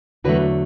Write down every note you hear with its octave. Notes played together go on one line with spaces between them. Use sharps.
E2 D3 F#3 A3 F#4 B4